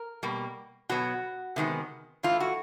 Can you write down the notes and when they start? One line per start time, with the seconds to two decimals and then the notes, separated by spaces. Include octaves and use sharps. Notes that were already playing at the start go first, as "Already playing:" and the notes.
Already playing: A#4
0.23 B2 G3 A#3
0.89 B2 F#3 B3 F#4
1.56 C3 D#3 G#3 B3
2.23 G2 E3 A3 F4
2.40 F#4